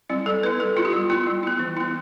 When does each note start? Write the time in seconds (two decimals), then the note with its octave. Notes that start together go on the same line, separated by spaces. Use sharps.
0.10 G3 C4 E4
0.26 G3 A4
0.43 B3 E4 B4
0.59 G3 A4
0.76 B3 E4 F4
0.85 G4
0.93 G3 F4
1.10 B3 E4 F4
1.27 G3
1.43 B3 E4
1.59 E3
1.77 B3 E4